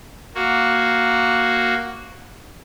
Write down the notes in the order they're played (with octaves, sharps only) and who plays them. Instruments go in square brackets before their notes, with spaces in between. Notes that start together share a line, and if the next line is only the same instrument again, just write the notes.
[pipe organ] A#3 F#4